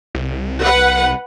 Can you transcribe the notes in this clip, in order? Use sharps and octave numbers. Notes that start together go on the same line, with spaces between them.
C2
B4 F#5